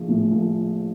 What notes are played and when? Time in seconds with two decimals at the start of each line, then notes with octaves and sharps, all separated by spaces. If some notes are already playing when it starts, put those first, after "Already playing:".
Already playing: A#1 F3
0.08 A2
0.32 F3